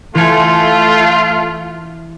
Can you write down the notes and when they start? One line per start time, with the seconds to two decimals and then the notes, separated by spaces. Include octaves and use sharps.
0.15 E3 A3 F4 G#5